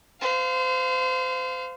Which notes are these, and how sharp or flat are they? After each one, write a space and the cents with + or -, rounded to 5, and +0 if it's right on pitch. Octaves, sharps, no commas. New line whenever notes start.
C5 -30 F5 +0